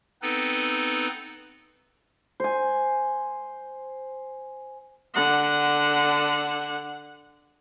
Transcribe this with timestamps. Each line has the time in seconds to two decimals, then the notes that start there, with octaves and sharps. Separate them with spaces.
0.22 B3 C4 D#4 A4 B4
2.40 C5 G#5
5.14 D3 F#5